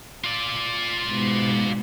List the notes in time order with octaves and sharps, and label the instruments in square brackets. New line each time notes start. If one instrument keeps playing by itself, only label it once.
[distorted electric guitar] F4 D5
[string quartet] G#2 B2